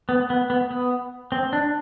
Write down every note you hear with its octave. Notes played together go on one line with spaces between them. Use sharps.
B3
B3
B3
B3
C4
D4